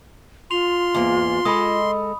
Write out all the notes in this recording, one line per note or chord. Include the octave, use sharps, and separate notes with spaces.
F4 C6 F7
E2 G#2 A#3
G#3 A4 D#5 B5 D#6